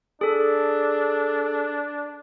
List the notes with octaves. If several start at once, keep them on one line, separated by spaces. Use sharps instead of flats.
D4 G#4 A4